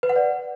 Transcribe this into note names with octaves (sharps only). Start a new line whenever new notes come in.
B4
F#5
D5